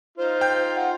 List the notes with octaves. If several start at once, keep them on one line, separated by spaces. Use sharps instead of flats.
D#4 F4 C5
G5 G6
F#5